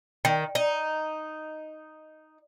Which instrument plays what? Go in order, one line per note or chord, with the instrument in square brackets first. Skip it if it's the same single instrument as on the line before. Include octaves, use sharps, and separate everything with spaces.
[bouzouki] D#3
D#4